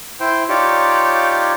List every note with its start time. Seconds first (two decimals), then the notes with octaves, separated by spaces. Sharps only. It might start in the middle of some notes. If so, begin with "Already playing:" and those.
0.20 E4 C5 G5
0.49 D#4 F4 G4 C#5 D5